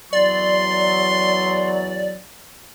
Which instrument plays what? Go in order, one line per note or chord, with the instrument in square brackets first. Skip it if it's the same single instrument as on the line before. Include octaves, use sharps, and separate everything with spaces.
[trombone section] E2 F#3 [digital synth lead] D5 [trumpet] C6